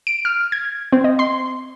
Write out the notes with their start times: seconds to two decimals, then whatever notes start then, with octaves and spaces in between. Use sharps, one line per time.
0.07 D7
0.25 F6
0.52 G#6
0.92 C4
1.04 D#5
1.19 C6